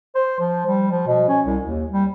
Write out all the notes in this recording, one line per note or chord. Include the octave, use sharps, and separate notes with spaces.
C5
F3
G3
F3
B2
C#4
C2
D#2
G3